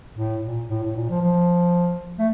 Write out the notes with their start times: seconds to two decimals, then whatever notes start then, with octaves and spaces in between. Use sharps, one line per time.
0.17 A2
0.44 A#2
0.70 A2
0.83 A2
0.96 A#2
1.10 F3
1.22 F3
2.19 A3